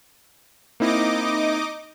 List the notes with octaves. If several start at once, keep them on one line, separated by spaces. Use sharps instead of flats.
A#3 C4 D#4 E4 D#5 D6